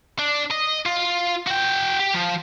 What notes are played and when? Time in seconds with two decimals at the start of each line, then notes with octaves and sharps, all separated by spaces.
0.19 D4
0.51 D#5
0.86 F4
1.47 F#4 G5
2.00 G4
2.14 F3